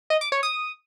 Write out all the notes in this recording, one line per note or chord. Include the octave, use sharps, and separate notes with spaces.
D#5
D6
C#5
D#6